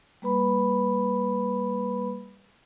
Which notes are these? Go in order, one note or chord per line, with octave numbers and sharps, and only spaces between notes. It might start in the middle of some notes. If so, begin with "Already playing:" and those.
G3 A#3 B4 B5